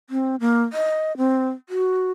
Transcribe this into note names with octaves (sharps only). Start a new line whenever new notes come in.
C4
A#3
D#5
C4
F#4